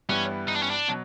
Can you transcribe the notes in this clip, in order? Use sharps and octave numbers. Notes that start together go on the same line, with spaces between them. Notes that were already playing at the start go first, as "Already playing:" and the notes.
G2 E3 G3 B3 C#4 E4
D#4
D4
C#4
D4
B2 F#3